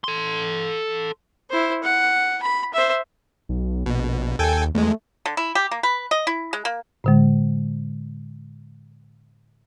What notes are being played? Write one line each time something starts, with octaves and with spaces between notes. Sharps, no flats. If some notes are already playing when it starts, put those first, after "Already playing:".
A4 C6
E4 C5
F#5
B5
C5 E5
B1
A#1 B2
D#2 A4 G5 G#5
E2 G#3 A3
D3
E4
G4
A#3
B4
D#5
E4
G#3
A#3
A2 D3 G#3